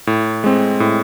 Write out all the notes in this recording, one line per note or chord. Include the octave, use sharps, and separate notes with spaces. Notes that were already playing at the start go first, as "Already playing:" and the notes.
A2
G#3 C4
A2